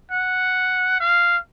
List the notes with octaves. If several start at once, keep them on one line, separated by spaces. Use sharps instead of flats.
F#5
F5